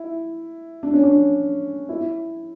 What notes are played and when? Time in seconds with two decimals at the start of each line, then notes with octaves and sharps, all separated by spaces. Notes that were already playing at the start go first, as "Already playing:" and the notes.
Already playing: E4
0.83 D4
0.94 C#4
1.03 D4
1.89 E4